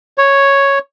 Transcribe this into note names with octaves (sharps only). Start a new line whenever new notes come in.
C#5